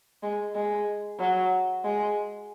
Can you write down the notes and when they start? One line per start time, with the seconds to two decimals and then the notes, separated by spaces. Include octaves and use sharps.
0.23 G#3
0.55 G#3
1.19 F#3
1.84 G#3